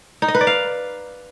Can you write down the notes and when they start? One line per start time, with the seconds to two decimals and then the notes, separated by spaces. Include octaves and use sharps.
0.22 D#4
0.28 D#5
0.35 B4
0.41 D5
0.47 F5